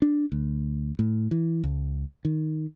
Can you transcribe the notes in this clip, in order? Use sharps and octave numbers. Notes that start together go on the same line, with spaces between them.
D4
D2
A2
E3
C#2
D#3